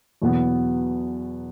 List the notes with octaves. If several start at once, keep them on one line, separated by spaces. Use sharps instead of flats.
E2 B2 F#3 B3